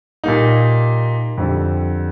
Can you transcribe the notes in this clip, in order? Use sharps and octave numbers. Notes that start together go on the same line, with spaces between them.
A#2 G3 A#3 D#4
F2 D3 G3